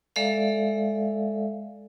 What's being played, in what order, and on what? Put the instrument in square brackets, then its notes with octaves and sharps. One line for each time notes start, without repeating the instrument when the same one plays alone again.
[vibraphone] G#3 A4 D5 E5 F5